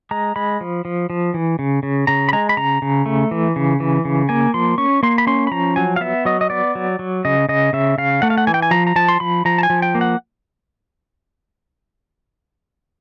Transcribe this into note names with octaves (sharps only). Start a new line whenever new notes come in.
G#3 A#5
G#3 B5
F3
F3
F3
E3
C#3
C#3
C#3 A#5
B5
G#3 A#5
B5
C#3 A#5
C#3
A3
E3
C#3
E3
C#3
A#3 G#5
F3 C6
C#4 C#6
A#3 C6
B5
C#4 C6
B5
F3 A#5
F#3 G#5
F5
B3 E5
F#3 D#5
D#5
B3 D5
F#3
F#3
C#3 D#5
C#3 D#5
C#3 E5
C#3 F5
A3 F#5
F5
F#5
E3 G#5
G5
G#5
F3 A#5
A#5
F3 A5
C6
F3 B5
F3 A#5
A5
G#5
F3
G5
A#3
F#5